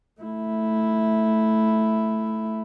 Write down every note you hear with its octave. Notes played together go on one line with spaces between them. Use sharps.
A3 E4